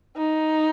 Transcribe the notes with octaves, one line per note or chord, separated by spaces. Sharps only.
D#4